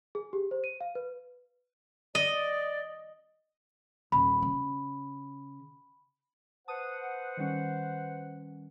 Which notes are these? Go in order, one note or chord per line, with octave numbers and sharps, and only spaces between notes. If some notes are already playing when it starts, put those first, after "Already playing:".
G#4
G4
C5
D#7
F5
B4
D5 D#5
D#1 B5
C#3
B4 C5 F#5 A5 D#6 D#7
D#3 G3 C#4